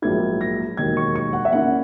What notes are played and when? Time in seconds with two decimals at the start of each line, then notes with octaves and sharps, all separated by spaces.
0.02 A#1 G#2 F#3 A#3 E4 G#6
0.41 A#6
0.77 E1 D#2 D#3 F#3 G#6
0.97 C#6
1.16 C#6
1.33 F#5
1.45 E5
1.52 A#2 A#3 C#4 E4 F#5